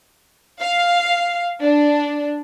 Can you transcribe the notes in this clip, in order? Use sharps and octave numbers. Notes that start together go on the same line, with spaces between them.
F5
D4